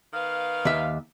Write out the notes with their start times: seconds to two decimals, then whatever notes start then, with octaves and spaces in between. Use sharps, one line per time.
0.13 D#3 B3 F5
0.65 D#2 E5